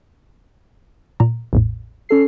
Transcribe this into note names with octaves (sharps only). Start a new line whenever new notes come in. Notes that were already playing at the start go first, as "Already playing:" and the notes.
A#2 A#5
A1 E2 A2
C#4 A4 C7